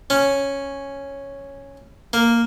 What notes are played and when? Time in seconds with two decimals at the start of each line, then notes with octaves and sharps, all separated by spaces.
0.10 C#4
2.13 A#3